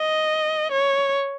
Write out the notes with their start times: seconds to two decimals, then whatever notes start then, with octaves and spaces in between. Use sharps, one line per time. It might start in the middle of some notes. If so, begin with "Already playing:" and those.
Already playing: D#5
0.72 C#5